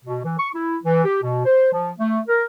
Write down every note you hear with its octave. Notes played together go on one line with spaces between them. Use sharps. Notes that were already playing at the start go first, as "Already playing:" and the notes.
B2
E3
C#6
E4
E3
G4
B2
C5
F3
A3
A#4